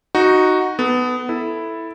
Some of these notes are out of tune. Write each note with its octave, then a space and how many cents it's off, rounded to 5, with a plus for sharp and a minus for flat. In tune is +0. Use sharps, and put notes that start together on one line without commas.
D#4 +0 F#4 +0
B3 +15 A4 -10
E4 +0 A4 +0